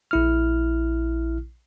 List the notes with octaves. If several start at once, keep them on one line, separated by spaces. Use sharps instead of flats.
A#1 E4 F6